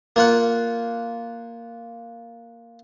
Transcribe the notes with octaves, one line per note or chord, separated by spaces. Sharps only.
A#3 F4 F#5